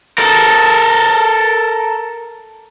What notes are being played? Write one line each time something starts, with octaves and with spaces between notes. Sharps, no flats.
A4 A#4